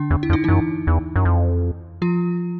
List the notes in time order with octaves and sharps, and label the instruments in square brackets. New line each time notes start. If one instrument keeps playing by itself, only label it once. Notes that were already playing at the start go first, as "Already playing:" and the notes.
Already playing: [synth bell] D3 D4
[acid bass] E2
[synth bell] E4
[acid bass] F2
[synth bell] D#4
[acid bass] F#2 [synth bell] E3 E4
[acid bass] E2
F#2
F2
[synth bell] F3 F4